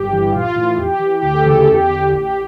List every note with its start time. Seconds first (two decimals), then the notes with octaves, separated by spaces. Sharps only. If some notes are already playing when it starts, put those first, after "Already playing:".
Already playing: G1 G4
0.09 G2 E3
0.31 A#1 F4
0.55 A2 E3
0.77 E2 G4
0.99 E3
1.22 D2 G4
1.35 A4
1.44 C#3 E3 G4
1.60 A4
1.68 E2
1.73 G4
1.90 D3
2.11 A1 G4